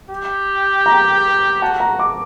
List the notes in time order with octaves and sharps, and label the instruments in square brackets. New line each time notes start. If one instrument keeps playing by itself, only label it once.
[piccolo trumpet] G4
[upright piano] A#5
[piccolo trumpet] F#4 [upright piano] A5
[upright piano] A#5
D6